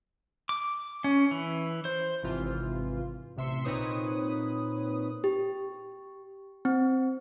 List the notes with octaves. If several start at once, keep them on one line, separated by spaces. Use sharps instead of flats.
D6
C#4
E3
C5
G#1 C3 E3 F4
A1 C3 E5 C6 C#7
A#2 C4 D#4 B4 C#5 D#6
G4
C4